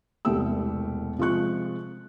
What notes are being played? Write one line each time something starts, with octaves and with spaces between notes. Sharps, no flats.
E1 C2 B2 A3 G4 E6
C3 F3 G#3 C#6 F#6